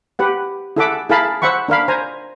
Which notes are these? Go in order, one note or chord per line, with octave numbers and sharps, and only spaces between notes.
G4 B4 F#5
E4 G#4 A4 E5 F#5 D6
E4 G#4 A#4 F5 A5 B5
C5 E5 F#5 B5 C#6
D4 A#4 F5 B5
C5 G#5 A#5